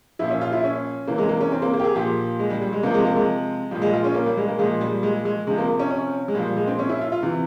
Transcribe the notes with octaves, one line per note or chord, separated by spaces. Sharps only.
A#2 F3 E4
C#4
F4
E4
C#4
C3 E3 A#3
G#3
A#3
C#4
C4
A#3
A#3
G4
G#4
A#2 F3 G4
G#3
G3
G3
G#3
C3 F3 A#3
G#3
A#3
G#3
A#2 F3 G3
G#3
F4
C#4
A#3
G3
G#3
A#3
A#2 F3 G#3
G3
G#3
G#3
C3 F3 G#3
A#3
C#4
C#4
G#3
A#2 F3 G3
G#3
C4
C#4
E4
F4
F4
C3 E3